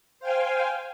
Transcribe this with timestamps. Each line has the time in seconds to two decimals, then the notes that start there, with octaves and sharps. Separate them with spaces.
0.20 C5 F5 G5 G#5